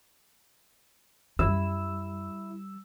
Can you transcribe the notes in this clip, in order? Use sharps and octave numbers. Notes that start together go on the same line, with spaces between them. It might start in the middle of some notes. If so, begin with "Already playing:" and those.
F#2 G3 E4 E6